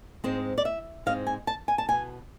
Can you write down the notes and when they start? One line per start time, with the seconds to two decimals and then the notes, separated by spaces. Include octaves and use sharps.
0.24 G#2 G#3 C4 C5
0.58 D5
0.65 E5
1.06 G#2 G#3 C4 F5
1.27 G#5
1.47 A5
1.68 G#5
1.78 A5
1.88 B2 B3 G#5